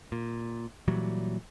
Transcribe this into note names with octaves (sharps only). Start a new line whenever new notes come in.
A#2
A#2 E3 F#3 G3